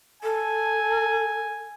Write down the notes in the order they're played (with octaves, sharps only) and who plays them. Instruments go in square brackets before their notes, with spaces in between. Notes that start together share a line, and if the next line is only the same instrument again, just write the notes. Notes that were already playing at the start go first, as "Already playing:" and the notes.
[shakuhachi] A4 [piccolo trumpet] G#5